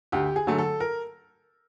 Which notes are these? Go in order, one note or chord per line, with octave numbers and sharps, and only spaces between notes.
D2 G4
G#4
D3 F#3 A3
A4
A#4